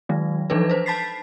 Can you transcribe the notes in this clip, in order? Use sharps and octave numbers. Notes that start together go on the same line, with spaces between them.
D#3 F#3 G#3
E3 F3 D4 D#4 A4 B4
B4 C5
A5 B5 A6 B6 C7